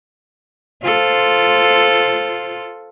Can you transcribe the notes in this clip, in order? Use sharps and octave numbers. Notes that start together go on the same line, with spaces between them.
F4 A4 C5